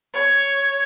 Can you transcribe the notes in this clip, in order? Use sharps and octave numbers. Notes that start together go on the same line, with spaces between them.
C#5